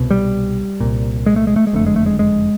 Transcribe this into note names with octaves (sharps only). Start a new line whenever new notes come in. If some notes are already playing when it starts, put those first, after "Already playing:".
Already playing: C2 B2
G3
C2 A#2
G#3
A3
G#3
A3
G#3
F#1 F2 D3 A3
G#3
A3
G#3
G#3